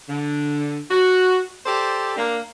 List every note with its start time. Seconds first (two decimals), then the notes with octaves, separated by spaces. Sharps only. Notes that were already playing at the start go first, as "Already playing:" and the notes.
0.09 D3
0.91 F#4
1.66 G4 A4 C5 D5
2.17 A#3 D4